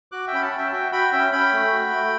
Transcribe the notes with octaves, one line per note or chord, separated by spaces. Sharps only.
F#4 D6 F#6
E5 G5
C#4 B5
F#5 A5
C#4
E5 G5
A5
F#4 E5 G5
F#4 G5 B5
C#4 E5 G5
C#4 G5 B5
A3
F#4
A3